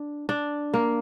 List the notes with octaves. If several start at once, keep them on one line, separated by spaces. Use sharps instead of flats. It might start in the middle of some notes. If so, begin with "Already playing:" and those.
Already playing: D4
D4
A#3